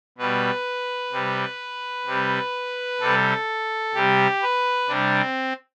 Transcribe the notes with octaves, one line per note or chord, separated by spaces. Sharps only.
B2 G3 B4
C3 G3
C3 G3
C3 G3 A4
C3 G3 G4
B4
C3 G3 D4
C4